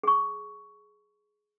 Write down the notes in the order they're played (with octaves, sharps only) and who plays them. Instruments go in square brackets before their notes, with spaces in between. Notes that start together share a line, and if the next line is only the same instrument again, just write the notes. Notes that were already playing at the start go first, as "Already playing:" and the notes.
[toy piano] G#4 C#6